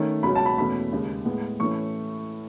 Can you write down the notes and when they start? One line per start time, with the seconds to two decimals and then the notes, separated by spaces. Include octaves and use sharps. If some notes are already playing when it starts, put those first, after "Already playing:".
Already playing: D#3 A3 C#4
0.23 C#2 B2 F#3 C#4 B5
0.35 A5
0.46 B5
0.58 E2 B2 A3 C#4 B5
0.92 D#2 C#3 G#3
1.25 A2 G#3 B3
1.60 A2 E3 A3 C#4 C#6